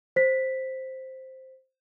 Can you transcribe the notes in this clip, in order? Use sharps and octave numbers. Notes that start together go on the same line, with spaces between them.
C5 B6